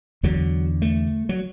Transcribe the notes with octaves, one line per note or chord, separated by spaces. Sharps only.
E2 D3 F#3
A3
F#3